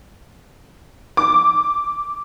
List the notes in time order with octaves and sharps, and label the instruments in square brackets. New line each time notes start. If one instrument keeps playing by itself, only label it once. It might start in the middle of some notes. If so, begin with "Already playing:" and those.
[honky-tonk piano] D6